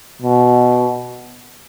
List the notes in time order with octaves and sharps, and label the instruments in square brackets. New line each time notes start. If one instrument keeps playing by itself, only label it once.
[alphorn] B2